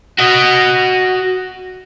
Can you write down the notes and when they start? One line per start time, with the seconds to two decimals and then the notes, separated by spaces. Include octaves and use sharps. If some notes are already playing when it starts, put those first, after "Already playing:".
0.18 F#4 D#5